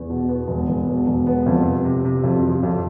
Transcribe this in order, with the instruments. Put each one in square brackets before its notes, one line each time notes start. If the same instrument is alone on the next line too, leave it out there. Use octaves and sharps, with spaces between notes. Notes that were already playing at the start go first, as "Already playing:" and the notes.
Already playing: [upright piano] E2
B2
B3
E1
E1
B2
E1
B3
F2
C3
C3
C3
F2
F3
F2